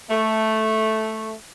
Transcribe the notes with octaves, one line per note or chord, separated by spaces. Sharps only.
A3